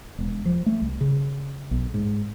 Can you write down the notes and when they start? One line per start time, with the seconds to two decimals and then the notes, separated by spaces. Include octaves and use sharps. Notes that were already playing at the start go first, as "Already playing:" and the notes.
0.18 E1
0.46 F3
0.66 A3
0.81 C2
1.01 C#3
1.71 B1
1.94 G#2